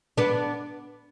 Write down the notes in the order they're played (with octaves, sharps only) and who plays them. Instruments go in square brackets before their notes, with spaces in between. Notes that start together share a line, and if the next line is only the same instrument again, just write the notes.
[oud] B3 D4